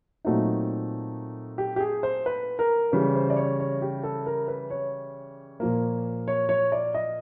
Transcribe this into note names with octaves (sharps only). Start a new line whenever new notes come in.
A#2 F#3 A3 C4 D#4 F#4
G4
G4
G#4
C5
B4
A#4
C#3 E3 G3 B4
C5
D5
C#5
C#5
G4
A4
A#4
B4
C#5
A#2 F3 A#3
C#5
C#5
D5
D#5